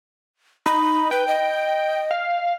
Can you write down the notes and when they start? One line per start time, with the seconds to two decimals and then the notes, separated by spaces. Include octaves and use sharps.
0.66 D#4 B5
1.11 B4 G5
1.28 D#5
2.11 F5